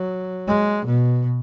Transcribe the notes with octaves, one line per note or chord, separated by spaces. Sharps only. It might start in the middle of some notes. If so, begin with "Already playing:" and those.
Already playing: F#3
G#3
B2